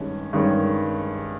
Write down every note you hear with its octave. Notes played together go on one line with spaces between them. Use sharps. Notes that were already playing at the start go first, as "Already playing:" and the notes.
Already playing: G2 D#3 G#3 C#4
G2 D#3 G#3 C#4